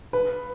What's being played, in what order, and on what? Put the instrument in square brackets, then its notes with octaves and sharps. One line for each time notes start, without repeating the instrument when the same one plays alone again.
[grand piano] B4